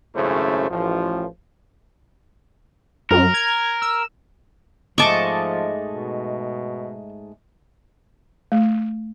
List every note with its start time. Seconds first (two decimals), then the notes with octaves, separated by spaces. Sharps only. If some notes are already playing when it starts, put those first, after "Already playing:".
0.16 G#1 F#2 C#3 A3 E4 C5
0.71 A1 F3
3.11 F#2 A#4
3.34 G#6
3.82 E6
4.98 G#2 F3 G#3 A3 D#5 A5 C#6 D6
5.88 B2
8.52 A3